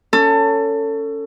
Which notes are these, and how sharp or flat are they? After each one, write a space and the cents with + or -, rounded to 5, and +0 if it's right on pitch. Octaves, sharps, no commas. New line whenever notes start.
C#4 +15 A4 +25